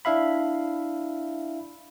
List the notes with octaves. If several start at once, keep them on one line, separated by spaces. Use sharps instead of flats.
D4 E4 E5 F5 B5